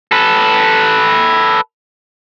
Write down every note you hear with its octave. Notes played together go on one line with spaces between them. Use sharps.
A4 B4